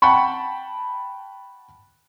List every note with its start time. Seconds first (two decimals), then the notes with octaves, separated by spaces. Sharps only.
0.02 F#5 G5 A5 B5 C#6